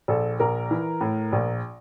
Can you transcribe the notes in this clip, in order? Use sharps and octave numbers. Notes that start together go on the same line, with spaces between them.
A#1 A4
A#1 A#4
E3
A2
A#1